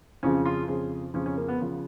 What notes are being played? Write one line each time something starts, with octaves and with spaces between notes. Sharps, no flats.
F2 C#3 F3 C#4
F4
F2 C#3 F3 G#4
F2 C#3 F3 C#4
C#4
A#3
B3
C#3 F3